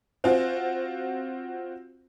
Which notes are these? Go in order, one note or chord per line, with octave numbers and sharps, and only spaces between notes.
C4 F4 F#4 C5 E5 G#5